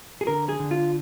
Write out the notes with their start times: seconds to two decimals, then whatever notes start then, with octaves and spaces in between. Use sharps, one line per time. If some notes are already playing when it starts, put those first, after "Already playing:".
0.21 G#4
0.27 D3 A#4
0.49 G#4
0.60 D3
0.71 F4